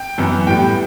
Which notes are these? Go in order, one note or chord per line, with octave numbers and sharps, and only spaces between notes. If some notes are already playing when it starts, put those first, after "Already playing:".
Already playing: G5
F#2 E3 B3
A2 G3 B3 G5